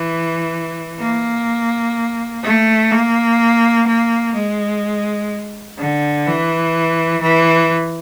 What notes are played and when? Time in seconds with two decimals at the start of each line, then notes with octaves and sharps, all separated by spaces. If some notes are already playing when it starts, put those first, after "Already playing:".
Already playing: E3
1.00 A#3
2.43 A3
2.91 A#3
3.87 A#3
4.34 G#3
5.78 D3
6.27 E3
7.22 E3